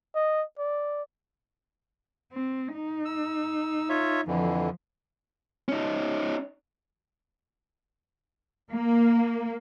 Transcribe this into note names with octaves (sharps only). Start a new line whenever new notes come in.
D#5
D5
C4
D#4
E6
F4 C#5 E5
F2 D3 E3 F3
C#4 D#4
A#3